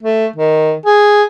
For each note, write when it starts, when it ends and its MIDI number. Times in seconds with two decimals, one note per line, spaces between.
0.03 0.26 57
0.36 0.73 51
0.86 1.23 68